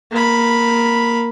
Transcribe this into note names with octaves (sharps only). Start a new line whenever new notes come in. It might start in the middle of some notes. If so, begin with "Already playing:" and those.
A#3 B5